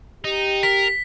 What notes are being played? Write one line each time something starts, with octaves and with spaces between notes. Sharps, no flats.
D#4 G4
A#4 B6